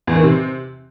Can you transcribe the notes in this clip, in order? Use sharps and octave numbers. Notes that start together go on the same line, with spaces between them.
E2
D#3
C3